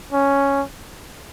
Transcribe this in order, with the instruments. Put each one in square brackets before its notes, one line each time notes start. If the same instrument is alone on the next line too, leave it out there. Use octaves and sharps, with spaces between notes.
[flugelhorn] C#4